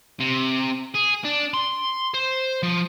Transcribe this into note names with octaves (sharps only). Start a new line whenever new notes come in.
C3
G#4
D4
C6
C5
F3